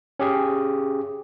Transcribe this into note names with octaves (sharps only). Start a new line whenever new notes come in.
C#4 G4 G#4